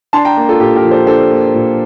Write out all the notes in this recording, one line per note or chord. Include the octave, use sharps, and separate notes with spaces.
D4 A5 C6
G5 A#5
A#3
F4 A4
A#2 G4
G4 A#4
F3
A4 C5
D4 A4 C5
A#3
A#2